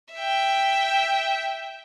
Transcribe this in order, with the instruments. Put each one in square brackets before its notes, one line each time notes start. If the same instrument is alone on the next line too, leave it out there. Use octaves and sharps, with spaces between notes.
[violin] E5 G5